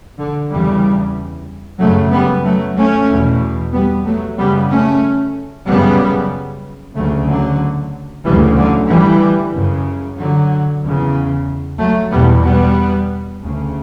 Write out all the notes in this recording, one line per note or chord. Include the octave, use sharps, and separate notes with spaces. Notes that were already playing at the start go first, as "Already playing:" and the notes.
D3
E2 C#3 E3 G3
F#2 C#3 F#3 A3
G3 B3
F#3 A3
A3 C#4
E2 B2
G3 B3
F#3 A3
F#2 C#3 G3 B3
A3 C#4
F#2 C#3 G3 B3
D2 C#3 F#3 A3
D3 F#3
D2 C#3 E3 G3
D3 F#3
E3 G3
F#2 C#3
D3 F#3
E2 C#3
F#3 A3
E2 B2 G3 B3
G3 B3
D2 C#3